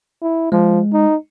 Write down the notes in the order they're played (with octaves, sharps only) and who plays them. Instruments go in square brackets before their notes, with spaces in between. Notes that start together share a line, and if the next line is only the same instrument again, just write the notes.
[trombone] E4
[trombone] F3 [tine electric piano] G#3
[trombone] D#4